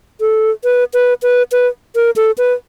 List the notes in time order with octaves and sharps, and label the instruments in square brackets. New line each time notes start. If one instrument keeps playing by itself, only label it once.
[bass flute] A4
B4
B4
B4
B4
A#4
A4
B4